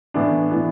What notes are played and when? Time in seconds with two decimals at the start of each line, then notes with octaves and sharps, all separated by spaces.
0.14 A2 E3 B3 D4
0.50 A2 E3 B3 D4